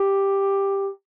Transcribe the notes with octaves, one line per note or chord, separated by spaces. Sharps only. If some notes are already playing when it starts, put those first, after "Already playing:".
Already playing: G4